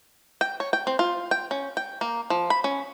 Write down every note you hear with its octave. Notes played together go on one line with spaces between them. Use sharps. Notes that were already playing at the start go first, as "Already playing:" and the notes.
G5
C#5
G5
C4
F4
G5
C#4
G5
A#3
F3
B5
C#4